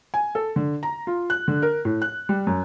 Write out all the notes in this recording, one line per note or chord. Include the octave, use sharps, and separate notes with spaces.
G#5
A4
D3
A#5
F4
F#6
D3
A#4
A2
F#6
G3
F#2